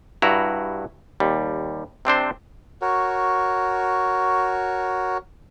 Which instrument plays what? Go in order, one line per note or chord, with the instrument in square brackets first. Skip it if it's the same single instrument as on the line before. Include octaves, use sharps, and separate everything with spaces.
[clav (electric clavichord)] G2 E4 F#4 A#5
D#2 G3
C3 C4 D4 C5
[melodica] F#4 A#4 C#5